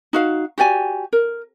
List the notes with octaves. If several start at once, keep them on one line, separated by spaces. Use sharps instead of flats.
D#4 F#4 F5
F#4 G4 D5 G#5
A#4